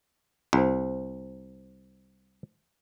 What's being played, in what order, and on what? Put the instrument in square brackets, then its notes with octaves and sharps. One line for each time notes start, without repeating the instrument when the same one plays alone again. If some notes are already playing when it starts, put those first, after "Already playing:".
[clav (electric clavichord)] C2 [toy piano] C5 D5